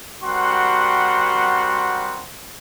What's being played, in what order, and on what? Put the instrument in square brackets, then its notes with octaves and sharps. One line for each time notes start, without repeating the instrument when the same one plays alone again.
[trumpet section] G3 C4 F#4 A#4 F#5 C6